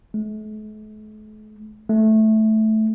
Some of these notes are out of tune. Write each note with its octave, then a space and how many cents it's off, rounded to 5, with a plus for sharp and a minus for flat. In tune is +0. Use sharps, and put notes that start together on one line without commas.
A3 -45
A3 -10